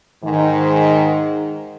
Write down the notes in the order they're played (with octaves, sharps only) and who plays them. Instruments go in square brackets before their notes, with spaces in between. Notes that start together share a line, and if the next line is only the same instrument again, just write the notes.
[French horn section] G#2 D#3